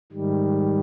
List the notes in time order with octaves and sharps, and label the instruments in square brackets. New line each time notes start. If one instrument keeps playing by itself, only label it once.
[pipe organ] G#2 D#3 G3